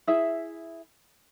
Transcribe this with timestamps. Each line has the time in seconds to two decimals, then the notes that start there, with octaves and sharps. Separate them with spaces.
0.07 E4 G#4 E5